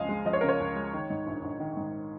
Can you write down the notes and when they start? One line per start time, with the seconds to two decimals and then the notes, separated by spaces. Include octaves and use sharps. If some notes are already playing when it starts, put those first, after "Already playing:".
Already playing: C#2 C#3 F3 D#5 F5 G#5
0.09 G#3
0.25 F3 D#5
0.33 C#5
0.41 C#3 A#4
0.48 C#5
0.60 C#2
0.76 G#3
0.93 D#3
1.10 G#2
1.27 A#1
1.43 A#1
1.60 D#3
1.77 G#2